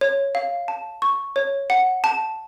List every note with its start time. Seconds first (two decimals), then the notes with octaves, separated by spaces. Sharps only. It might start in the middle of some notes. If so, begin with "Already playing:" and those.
0.01 C#5
0.35 F5
0.68 A5
1.02 C#6
1.36 C#5
1.70 F#5
2.04 A5